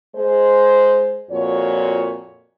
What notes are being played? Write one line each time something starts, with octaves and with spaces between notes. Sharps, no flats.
G#3 C5
F2 A#2 F#4 C#5